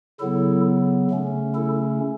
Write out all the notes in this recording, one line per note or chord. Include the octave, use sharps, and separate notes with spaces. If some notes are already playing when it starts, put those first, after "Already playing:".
C#3 F#3 B3 E4 A4
C#3 A3 C#4
E4 A4